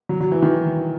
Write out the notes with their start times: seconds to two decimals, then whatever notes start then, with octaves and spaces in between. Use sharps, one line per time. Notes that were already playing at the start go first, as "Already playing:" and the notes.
0.09 F#3
0.21 F#3
0.32 E3
0.42 D#3